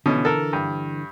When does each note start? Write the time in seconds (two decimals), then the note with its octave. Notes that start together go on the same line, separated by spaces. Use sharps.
0.06 B2 D3 E3 C#4
0.25 A4 A#4
0.53 G2